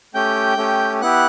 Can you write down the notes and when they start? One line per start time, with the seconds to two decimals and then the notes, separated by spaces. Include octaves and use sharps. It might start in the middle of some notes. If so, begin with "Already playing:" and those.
0.14 A3 C#4 G4 G5 G6
0.57 A3 C#4 G4
1.01 B3 E4 G4 F#5 F#6